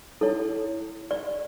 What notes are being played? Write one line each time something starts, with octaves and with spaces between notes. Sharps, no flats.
E4 A4 C#5
D5